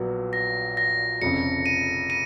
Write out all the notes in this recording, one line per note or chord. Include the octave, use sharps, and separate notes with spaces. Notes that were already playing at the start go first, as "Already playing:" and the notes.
Already playing: A#1 A#2 F#3 B3
A#6
A#6
F1 F2 C#3 C#7
D#7
D#7